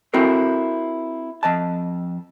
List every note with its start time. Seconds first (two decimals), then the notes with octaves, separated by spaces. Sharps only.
0.14 C4 E4 F#4 A4 A#4
1.43 F2 D#5 A5